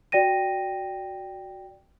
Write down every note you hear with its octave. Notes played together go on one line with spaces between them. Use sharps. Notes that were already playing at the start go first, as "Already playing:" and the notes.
F#4 D5 G5 A#6 D#7